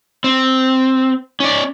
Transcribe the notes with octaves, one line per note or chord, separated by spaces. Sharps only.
C4
C#4 D5